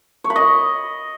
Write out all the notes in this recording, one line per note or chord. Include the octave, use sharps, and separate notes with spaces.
C#5
B5
D#5